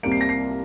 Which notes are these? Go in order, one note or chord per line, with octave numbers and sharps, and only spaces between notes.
C2 C3 G3 A#3 D7
C7
A#6
C7